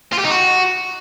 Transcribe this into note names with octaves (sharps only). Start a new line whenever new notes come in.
F4
G4
D#4
F#4